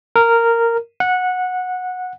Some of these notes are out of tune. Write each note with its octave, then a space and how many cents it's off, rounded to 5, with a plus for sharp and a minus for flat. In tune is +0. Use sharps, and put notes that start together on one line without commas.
A#4 -10
F#5 -15